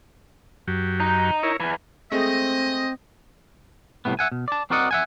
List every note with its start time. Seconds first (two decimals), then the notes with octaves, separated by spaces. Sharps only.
0.68 F#2 F#3 G4
1.00 D#4
1.43 E4 A#4 C#5
1.60 E2 E3 G#5
2.12 G#3 A3 C4 D#5
4.05 C2 A2 C3 B3
4.19 E5 F#5 G#5
4.32 B2
4.48 D5 A5
4.70 C4 F#4 A#4 D5 D#5 F#5
4.91 E5 F#5 G#5